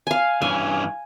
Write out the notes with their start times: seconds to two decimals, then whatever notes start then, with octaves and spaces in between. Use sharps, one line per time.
0.07 F5 G#5
0.42 G2 E3 C#4 G#5